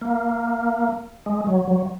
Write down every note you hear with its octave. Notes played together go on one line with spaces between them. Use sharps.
A#3
G#3
F#3
F#3